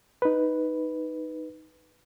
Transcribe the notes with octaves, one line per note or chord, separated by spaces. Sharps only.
D#4 B4